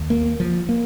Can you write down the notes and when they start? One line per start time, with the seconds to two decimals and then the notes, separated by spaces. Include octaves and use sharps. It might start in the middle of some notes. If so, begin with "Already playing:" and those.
Already playing: D#2
0.10 A#3
0.40 F3
0.69 A#3